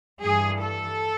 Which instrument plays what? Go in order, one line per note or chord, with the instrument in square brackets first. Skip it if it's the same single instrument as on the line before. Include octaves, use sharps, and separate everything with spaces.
[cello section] G2 E3 G3 G#4
A4